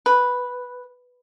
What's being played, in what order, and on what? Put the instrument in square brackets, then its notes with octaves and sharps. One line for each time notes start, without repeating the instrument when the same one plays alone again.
[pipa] B4